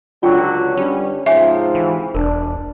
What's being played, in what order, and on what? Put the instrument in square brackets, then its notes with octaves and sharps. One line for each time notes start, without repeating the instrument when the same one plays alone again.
[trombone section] C#2 D3 F#3 [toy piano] F4 G5
[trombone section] G2 D3 G3 [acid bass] C#4
[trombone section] G#2 C3 F3 [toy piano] G#4 C#5 G#5 [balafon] E5
[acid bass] E3
[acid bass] E1 [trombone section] D4 [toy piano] A#4